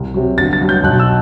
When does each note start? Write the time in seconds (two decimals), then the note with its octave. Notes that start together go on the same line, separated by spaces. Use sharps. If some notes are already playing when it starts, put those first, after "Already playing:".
Already playing: C2
0.14 C3 F#3
0.38 G1 A6
0.53 A6
0.61 G2 F#3
0.69 G6
0.84 B1 F#6
0.99 E6